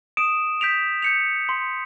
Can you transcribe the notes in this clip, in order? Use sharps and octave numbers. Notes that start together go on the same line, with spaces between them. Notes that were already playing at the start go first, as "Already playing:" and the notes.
D#6 D7 E7
G6 B6 D7 F7
G6 C#7 F7
C6